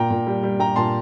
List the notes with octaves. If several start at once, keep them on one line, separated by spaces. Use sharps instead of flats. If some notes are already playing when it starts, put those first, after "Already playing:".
Already playing: A#2 G5 A#5
A#2
G3
G3
G3 G5 A#5
A#2 A5 C6